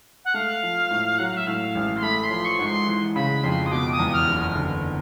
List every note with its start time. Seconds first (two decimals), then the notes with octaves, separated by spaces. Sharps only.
0.25 F#5
0.34 A3 F5
0.63 F3
0.90 A2
1.18 F#3 F#5
1.29 F5
1.37 E5
1.47 A2 F5
1.75 A1
1.97 C6
2.02 A3 B5
2.24 C6
2.31 F3
2.45 C#6
2.59 G#2
2.66 C6
2.87 E3
3.15 C#3 B5
3.44 F2 C6
3.66 D#6
3.71 B2 D6
3.92 D#6
3.99 E2
4.13 F6
4.27 F#1
4.56 D3